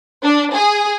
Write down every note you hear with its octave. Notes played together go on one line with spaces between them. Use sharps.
D4
G#4